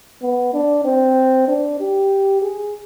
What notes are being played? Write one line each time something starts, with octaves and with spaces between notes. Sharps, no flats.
B3
D4
C4
D4
G4
G#4